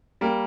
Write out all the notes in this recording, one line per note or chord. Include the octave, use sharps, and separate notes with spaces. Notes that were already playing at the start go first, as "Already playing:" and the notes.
G3 A#3